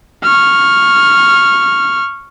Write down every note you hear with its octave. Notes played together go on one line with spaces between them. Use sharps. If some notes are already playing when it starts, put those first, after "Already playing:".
C#6 F6